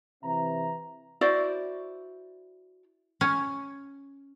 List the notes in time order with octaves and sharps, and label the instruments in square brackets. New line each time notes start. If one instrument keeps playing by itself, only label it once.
[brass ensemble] C3 E3 C4 B4 E5 A#5
[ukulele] E4 F#4 C5 D5
[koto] C#4